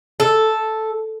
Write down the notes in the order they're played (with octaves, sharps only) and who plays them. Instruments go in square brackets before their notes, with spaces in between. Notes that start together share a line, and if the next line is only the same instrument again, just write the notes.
[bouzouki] A4